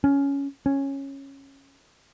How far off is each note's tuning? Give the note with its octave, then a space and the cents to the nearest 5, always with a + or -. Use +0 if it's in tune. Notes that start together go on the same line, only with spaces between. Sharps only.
C#4 +10
C#4 -10